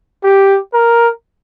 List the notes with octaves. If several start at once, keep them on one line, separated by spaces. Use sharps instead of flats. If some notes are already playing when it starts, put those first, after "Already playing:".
G4
A#4